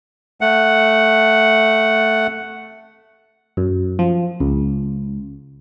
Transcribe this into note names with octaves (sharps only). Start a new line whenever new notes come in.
A3 F#5
F#2
F3
C#2